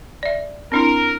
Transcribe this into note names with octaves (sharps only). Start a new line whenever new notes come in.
D5 E5
C4 D4 E4 A#4